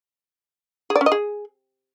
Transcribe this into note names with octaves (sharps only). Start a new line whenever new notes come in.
G#4
D5
C#4
D#5
G#4